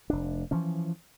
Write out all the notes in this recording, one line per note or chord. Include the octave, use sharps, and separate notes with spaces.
F1 D4
E3 F3 C#4